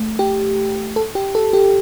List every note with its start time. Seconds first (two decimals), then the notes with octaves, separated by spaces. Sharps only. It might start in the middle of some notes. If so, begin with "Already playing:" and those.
Already playing: A3
0.19 G4
0.96 A4
1.15 G4
1.35 A4
1.53 G4